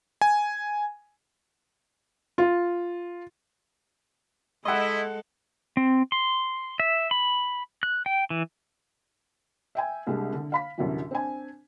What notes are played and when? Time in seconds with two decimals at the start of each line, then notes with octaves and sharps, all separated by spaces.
0.21 G#5
2.38 F4
4.66 G#3 E4 A4 D#5 F#5 C6
5.77 C4
6.12 C6
6.80 E5
7.11 B5
7.83 F#6
8.06 G5
8.30 E3
9.75 E5 G5 G#5
10.07 C2 G3 G#3 D4
10.33 D3
10.52 F5 B5 B6
10.78 C2 F#2 D3 E3 F#3 G3
11.11 C4 D4 G#5